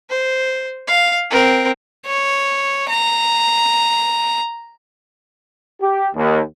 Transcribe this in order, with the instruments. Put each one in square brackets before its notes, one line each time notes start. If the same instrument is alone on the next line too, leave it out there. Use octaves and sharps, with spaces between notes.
[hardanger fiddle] C5
F5
C4 A#4
C#5
A#5
[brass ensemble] G4
D#2